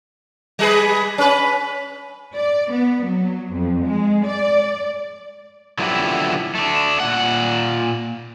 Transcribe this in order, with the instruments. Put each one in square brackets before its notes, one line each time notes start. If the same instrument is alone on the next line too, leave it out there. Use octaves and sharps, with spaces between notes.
[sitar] G3 G#4 B4
C#4 B4
[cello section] D5
B3
F#3
F2
G#3
D5
[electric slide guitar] D3 F3 F#3 B3 E4 G4
A3 D4
A#2 F#5